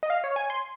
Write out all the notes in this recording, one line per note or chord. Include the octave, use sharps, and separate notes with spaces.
D#5
F5
C#5
G#5
C6